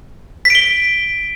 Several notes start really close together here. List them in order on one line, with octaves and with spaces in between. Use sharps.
B6 D7 G7